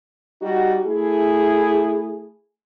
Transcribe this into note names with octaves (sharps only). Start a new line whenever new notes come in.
G3 D#4 F#4
A3 E4 G#4